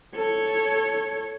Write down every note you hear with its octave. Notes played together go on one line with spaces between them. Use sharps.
A4 C#5